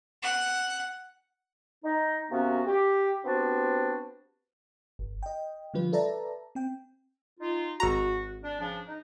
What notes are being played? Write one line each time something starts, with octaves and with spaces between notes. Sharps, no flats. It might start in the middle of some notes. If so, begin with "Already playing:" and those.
F#5
D#4
C3 A#3 B3 C#4 F#4
G4
B3 C4 D4 F#4 G4 C5
G1
D#5 G5
D3 F3 G3 F4 B4
A4 B4 D5 E5 A5 A#5
C4 G5
D#4 F4
G#1 F#4 A#5
D4
C#3 F3 D4
D#4